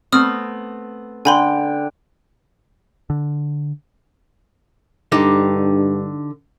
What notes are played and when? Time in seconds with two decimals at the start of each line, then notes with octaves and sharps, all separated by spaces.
0.12 A3 B3 C4 D#6 F6
1.25 D3 G5 G#5 B5 C6
3.10 D3
5.12 G2 D3 D#4 G4